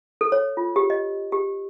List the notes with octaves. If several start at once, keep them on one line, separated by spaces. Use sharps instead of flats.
A4
C#5
F4
G4
D#5
G4